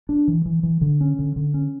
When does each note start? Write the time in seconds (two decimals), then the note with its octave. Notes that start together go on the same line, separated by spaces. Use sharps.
0.09 D4
0.28 E3
0.46 E3
0.63 E3
0.81 D3
1.01 C#4
1.19 D3
1.36 D3
1.54 C#4